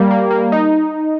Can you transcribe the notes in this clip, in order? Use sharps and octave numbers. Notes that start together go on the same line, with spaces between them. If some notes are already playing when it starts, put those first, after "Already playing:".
Already playing: G3 A#3
A#3
A#3
D#4